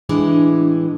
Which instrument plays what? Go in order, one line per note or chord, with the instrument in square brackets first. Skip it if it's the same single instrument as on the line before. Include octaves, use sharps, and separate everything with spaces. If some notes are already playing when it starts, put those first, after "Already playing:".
[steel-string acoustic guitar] A2 E3 G#3 [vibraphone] D4